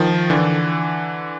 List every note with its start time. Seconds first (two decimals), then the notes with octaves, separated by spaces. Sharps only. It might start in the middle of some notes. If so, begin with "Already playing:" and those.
Already playing: D#3 F3
0.30 D3 E3